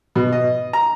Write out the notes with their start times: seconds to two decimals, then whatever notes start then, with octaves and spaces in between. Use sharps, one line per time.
0.16 B2
0.32 D#5
0.73 A#5